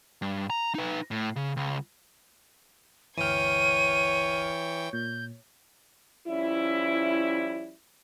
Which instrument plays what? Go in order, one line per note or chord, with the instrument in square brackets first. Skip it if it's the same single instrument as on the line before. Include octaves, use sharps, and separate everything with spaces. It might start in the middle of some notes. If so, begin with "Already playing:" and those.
[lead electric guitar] G2
A#5
D#4 B4
A2
C#3
C#2
[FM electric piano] G1 D2 F6 [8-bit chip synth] E3 G5 [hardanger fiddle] C#5 [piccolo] D#7
[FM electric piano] A#2 [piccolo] G6
[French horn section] F3 G3 C#4 E4